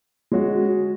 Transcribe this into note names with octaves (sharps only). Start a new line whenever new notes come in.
G#3 C#4 F#4